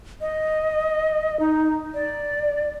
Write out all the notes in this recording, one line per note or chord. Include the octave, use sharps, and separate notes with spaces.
D#5
D#4
D5